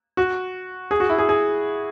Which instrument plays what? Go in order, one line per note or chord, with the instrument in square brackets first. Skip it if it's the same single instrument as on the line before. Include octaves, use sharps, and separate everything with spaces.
[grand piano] F#4
G#4
F#4
E4
G#4
G#4